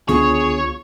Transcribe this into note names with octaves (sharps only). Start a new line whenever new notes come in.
C#2 D3 B3 D4 F4 G#4 C#5 C#6